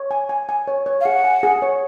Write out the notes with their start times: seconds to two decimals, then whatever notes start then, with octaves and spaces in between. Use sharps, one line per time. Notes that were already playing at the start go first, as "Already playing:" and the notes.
Already playing: C#5
0.11 G#5
0.29 G#5
0.49 G#5
0.68 C#5
0.86 C#5
1.01 F5
1.05 G#4 F#5
1.24 G#5
1.43 G#4
1.62 C#5